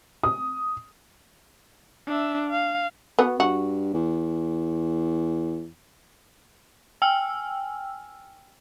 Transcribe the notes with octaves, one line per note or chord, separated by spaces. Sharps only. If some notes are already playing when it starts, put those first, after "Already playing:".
D#6
D4 E5
F5
B3 F#4
G2 F#4
E2
G5 G#5 E6 F6